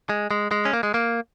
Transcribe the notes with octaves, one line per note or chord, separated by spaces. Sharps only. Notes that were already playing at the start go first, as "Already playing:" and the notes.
G#3
G#3
G#3
C#4
A#3
G#3
A#3